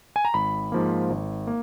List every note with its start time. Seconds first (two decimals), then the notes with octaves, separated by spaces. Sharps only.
0.16 G#5
0.25 A#5
0.34 G#1 B5
0.72 G#2 F3 A#3
1.10 G#1
1.47 A#3